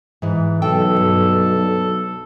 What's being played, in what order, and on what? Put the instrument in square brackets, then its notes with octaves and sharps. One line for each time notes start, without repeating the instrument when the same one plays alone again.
[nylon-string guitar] G#2 E3
[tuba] B1 [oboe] A4 [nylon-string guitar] G5
[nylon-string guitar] G2